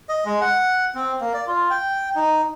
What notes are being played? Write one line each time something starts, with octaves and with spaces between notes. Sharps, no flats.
D#5
G#3
F#5
C4
A#3
D5
F4
G5
D#4